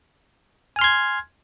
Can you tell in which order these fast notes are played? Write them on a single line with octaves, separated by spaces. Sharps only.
G#5 F6 C6 G#6